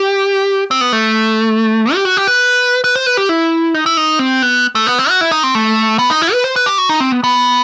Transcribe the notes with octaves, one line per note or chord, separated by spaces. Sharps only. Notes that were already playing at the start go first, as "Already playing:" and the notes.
Already playing: G4
C4
B3
A3
G4
F#4
G4
B4
B4
C5
B4
G4
E4
D#4
E4
D#4
C4
B3
A3
B3
C4
F#4
E4
D#4
C4
A3
B3
D#4
E4
B4
C5
B4
G4
F#4
D#4
C4
B3
B3